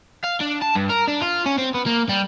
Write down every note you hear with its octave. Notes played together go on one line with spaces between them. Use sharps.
F5
D4
A5
G2
A#4
D4
F4
C#4
C4
B3
A#3
G3